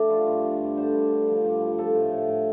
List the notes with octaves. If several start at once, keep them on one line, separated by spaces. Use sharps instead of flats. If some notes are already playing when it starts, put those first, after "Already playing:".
Already playing: G2 D3 A3 D4
F3 F4
G2
G2
G2
D3 C5
G2
D3
F3
G2
F3
F3 A4
A2
A2
A2